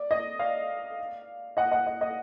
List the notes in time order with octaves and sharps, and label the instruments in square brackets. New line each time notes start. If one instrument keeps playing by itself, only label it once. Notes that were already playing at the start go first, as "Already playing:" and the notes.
Already playing: [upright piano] D5
D#5
D5 F5
D#5 F#5
D#5 F#5
D#5
D#5